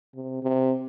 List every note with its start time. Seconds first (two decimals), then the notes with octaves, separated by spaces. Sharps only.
0.15 C3
0.42 C3